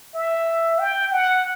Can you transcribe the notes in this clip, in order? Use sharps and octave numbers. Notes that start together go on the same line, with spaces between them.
E5
G5
F#5